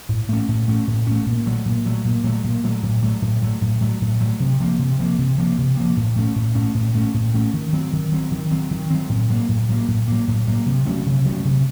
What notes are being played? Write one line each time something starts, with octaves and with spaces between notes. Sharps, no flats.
A2
A3 C#4
A2
A3 C#4
A2
A3 C#4
A#2
F#3 A3
A#2
F#3 A3
A#2
F#3 A3
A#2
F#3 A3
A2
F#3 A3
A2
F#3 A3
A2
F#3 A3
A2
F#3 A3
C3
F3 A#3
C3
F3 A#3
C3
F3 A#3
C3
F3 A#3
A2
A3 C#4
A2
A3 C#4
A2
A3 C#4
A2
A3 C#4
D#3
F#3 C4
D#3
F#3 C4
D#3
F#3 C4
D#3
F#3 C4
A2
F#3 A#3
A2
F#3 A#3
A2
F#3 A#3
A2
F#3 A#3
C3
F#3 A3 C#4
C3
F#3 A3 C#4
C3